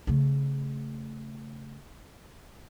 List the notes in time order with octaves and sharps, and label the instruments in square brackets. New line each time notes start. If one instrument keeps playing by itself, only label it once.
[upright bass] C#3 A3